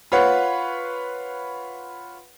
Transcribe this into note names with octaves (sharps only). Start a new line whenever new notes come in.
F4 B4 C#5 F#5